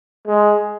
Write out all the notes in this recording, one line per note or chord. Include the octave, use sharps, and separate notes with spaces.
G#3